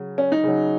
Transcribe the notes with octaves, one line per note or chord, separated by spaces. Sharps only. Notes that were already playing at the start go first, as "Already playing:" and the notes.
Already playing: C#3 F#3
C#4
D#4
C#3 F#3